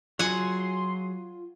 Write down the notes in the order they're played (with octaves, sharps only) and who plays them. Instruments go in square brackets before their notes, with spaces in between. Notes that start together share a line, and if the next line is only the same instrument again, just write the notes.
[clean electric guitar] F#3 G#4 [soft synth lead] F4 [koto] F#5 G#5 [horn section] C6